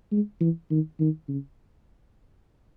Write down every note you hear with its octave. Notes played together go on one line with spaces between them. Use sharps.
G#3
E3
D#3
D#3
C#3